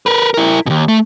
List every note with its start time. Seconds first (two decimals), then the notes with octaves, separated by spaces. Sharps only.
0.06 A#4 B4
0.34 E4 A#4
0.66 D#2 B2
0.88 A3